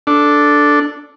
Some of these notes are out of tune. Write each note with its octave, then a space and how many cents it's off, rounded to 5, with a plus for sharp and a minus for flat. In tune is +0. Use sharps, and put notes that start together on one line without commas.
D4 +0 A4 +0